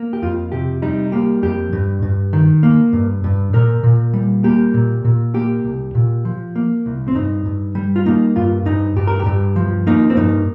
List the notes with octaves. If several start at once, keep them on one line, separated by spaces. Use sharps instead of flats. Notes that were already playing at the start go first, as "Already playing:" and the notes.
Already playing: A#3
G4
F2 F4
C3 G4
G3 D#4
A#3 G4
F2 G4
G2
G2
D#3
A#3
G2
G2
A#2 A#4
A#2
G3
A#3 G4
A#2
A#2
A#3 G4
C2
A#2
F3
A#3
C2
C4
G2 D#4
G2
G3
F4
A#3 D#4
G2 F4
G2 D#4
G2 G4
A#4
G4
G2
F3
A#3 D#4
C4
G2 D#4